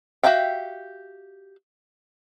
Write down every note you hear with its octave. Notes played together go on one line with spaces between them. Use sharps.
F#4 G4 E5 F5 G5